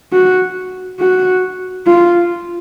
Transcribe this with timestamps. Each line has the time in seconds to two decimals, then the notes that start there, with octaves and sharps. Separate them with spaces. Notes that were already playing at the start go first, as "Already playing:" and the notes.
0.13 F#4
1.00 F#4
1.87 F4